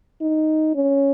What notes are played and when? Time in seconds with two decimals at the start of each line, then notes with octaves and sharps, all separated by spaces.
0.22 D#4
0.75 C#4